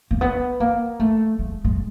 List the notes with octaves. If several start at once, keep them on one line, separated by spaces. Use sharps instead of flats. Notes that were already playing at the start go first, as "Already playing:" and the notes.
A#3
B3
A#3
A3
G#3
G#3